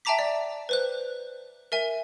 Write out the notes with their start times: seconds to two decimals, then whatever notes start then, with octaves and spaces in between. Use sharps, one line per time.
0.05 E5 G5 A5 A#5 D6 B6
0.19 D5
0.69 B4 C5 F#6
1.72 A#4 E5 G#5